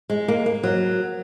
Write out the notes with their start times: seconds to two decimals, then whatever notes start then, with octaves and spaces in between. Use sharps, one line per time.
0.10 G#3
0.28 A#3
0.46 A#3
0.63 F#3